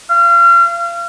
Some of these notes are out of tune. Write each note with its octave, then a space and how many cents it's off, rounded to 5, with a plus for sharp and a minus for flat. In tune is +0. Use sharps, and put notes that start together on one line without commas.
F5 -35